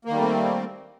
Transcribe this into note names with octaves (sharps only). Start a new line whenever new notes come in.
D#3 G3 A3 A#3 C4